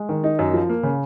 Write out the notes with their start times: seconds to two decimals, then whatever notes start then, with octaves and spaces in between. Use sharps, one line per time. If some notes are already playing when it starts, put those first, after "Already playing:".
Already playing: G#3
0.09 D#3
0.24 D#4
0.39 F#2
0.54 F3
0.69 A#3
0.83 C#3